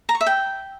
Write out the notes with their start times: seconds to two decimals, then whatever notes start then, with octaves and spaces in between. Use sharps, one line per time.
0.09 A#5
0.15 C#6
0.21 E5
0.27 G5